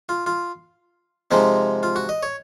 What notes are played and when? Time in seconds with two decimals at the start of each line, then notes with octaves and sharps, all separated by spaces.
0.09 F4
0.26 F4
1.31 C3 F3 G#3 C4 D#4
1.83 F4
1.96 F#4
2.09 D#5
2.23 C#5